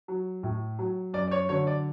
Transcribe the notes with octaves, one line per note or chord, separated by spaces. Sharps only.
F#3
A2
F#3
F#2 D5
D5
C#5
D3 F#3 C#5
D5